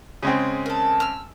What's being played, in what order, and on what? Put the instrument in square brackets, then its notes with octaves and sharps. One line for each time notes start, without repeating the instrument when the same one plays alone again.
[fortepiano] C#3 G#3 C4
[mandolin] A4 A#4
E6 F6